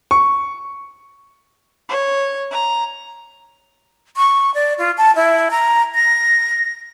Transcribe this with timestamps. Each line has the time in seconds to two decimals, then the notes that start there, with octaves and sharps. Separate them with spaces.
0.11 C#6
1.88 C#5
2.50 A#5
4.17 C#6
4.54 D5
4.78 F4
4.98 A5
5.16 E4
5.51 A#5
5.95 A#6